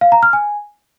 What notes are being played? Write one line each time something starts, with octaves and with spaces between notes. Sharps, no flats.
F5
A#5
F6
G#5